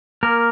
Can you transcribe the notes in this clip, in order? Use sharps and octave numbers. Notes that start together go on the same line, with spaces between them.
A#3 A#4